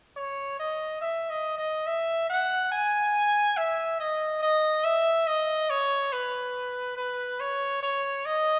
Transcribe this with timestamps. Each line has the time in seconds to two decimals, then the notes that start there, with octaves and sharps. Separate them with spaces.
0.17 C#5
0.59 D#5
1.01 E5
1.30 D#5
1.58 D#5
1.87 E5
2.29 F#5
2.72 G#5
3.57 E5
4.00 D#5
4.42 D#5
4.84 E5
5.27 D#5
5.70 C#5
6.12 B4
6.97 B4
7.40 C#5
7.83 C#5
8.25 D#5